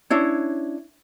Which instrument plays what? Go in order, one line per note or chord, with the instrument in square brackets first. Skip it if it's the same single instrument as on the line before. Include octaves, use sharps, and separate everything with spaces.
[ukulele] C#4 D4 E4 C#5